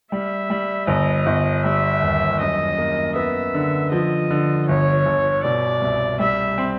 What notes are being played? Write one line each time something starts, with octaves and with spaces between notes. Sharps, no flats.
G3 E5
G3
G1 D#5
G1
G3 E5
D#2
F#2 D#5
A#3
B3 E5
D3
F3 D#5
D3
G1 C#5
G1
B2 D5
C2
G3 E5
C4